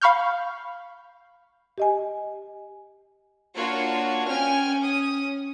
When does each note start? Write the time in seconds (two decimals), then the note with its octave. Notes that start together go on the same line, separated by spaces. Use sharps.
0.01 F5 B5 C#6 F6 G6
1.78 G4 D#5 G#5
3.55 A#3 D4 F4 F#4 C#5
4.27 C#4 G5 G#5 F6
4.82 D#6